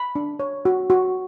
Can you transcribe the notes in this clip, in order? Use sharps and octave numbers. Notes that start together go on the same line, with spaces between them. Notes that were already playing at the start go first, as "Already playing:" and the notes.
Already playing: B5
D4
C#5
F#4
F#4